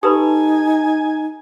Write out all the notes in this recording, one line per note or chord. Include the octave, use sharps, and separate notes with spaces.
D#4 G4 A4 B4 G#5 A5 B5 D#6